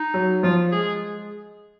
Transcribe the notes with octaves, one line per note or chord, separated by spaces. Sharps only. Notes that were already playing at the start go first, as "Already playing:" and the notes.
Already playing: D#4
F#3
F3 F4
G#3 G#4